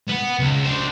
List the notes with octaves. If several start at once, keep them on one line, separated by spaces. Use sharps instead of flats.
B3
C#2
D4 C5